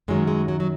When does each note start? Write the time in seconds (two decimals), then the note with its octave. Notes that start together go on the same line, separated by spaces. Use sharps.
0.08 F#2 D#3 F#3 G#3
0.27 G#3
0.48 F#3
0.60 F#3